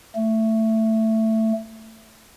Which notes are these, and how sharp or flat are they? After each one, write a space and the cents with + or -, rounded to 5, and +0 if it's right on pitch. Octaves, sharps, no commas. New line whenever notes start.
A3 +10